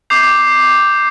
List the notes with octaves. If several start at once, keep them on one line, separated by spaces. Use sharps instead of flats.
D6 G6 C7 F7